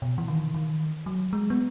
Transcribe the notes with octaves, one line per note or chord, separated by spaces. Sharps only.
B2
E3
D#3
D#3
F#3
G#3
B3